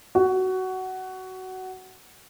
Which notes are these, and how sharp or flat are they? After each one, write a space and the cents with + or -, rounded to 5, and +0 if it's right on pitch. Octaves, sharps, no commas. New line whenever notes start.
F#4 +15